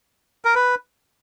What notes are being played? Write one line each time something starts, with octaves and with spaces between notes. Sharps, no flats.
A#4
B4